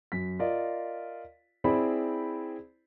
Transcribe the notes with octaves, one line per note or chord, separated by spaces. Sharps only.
F#2 B6
F4 A#4 D5 D#5 F5
C4 E4 G#4 C5 D5 B5